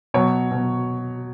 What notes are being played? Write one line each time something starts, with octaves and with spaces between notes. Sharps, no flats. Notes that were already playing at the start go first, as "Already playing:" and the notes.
B2 F#3 C#5
B2 F#3